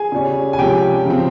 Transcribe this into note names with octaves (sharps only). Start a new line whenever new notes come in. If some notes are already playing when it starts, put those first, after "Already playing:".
Already playing: G#4 G#5
C#3 G3 C#4
G#5
C3 F3 G#3 C#4 G4 G5
C#3 F3 C4